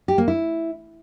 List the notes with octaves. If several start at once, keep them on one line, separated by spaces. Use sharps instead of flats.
G4
A#3
E4